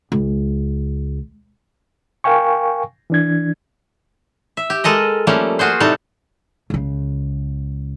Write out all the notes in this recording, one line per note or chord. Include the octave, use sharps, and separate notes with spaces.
C#2
A#4 F5 G5 G#5 C#6
E3 D4 G#6
E5
G4
G#3 A4 A#4 D#5
F3 G3 A3 A#3 C#4
F4 F#4 G#4 C5
A2 C3 G3 D#4 A4 F#5
C#2 C#3